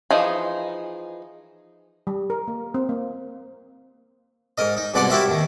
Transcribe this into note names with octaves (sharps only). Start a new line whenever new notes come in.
E3 F3 D#4 G#4
G3
A#4
A#3
C4
A#3
G#2 A#4 D#5
D#4
C2 G#2 B2 D5 F#5 C6
E4 F#4 G4 A#4 C5 E5
D#2 D#3